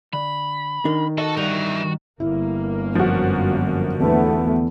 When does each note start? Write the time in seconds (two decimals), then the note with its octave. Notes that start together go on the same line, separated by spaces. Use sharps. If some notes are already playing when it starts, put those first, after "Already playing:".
0.13 D3 B5
0.85 D#3 D4 A#4
1.18 F#4 A4 D#5
1.37 G2 E3 D#4
2.20 G1 A#3 E4
2.95 F#2 F3 F#4
4.00 E2 D3 E3 A3 B3